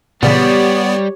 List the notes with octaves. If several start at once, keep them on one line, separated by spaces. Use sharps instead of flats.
A#2 C#3 E3 G3 B3 G4 C#5 D5